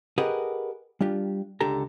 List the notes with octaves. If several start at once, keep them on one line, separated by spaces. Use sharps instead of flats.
G4 G#4 A#4 B4 D#5 F#5
G3 D4 F4 G4
C#2 D3 G4 A4 A#5